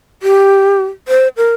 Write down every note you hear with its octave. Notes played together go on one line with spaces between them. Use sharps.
G4
C5
A#4